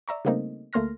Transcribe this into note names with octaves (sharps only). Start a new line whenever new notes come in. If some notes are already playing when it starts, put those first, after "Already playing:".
D5 E5 A#5 C#6
C#3 G3 A3 A#3 C4 D#4
D2 A3 A#3 C6 F6 A#6